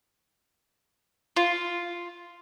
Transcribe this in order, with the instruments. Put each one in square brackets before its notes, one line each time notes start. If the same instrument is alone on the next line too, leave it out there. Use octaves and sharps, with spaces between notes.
[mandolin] F4